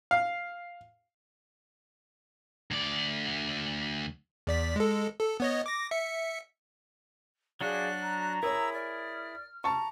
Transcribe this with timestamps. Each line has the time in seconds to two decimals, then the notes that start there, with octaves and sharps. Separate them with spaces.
0.11 F5
2.71 D2 D5
4.47 E2 D5 B6
4.76 G#3 A4
5.20 A4
5.40 B3 C#5 D#5
5.66 D6 A#6
5.91 E5 C#7
7.61 F#3 D4 F#4 G#4 D5 F5 F#6
8.03 A#5
8.43 E4 G#4 A#4 C#5 E6
8.73 D5 F6
9.64 A5 A#5 C#6